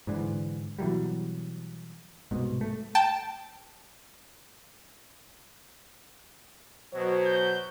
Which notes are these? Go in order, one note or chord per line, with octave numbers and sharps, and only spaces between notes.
G#2 D3 E3
B2 E3 F#3 G3
C2 G#2 B2
A3
G5 A5
B2 F#3 C5
G6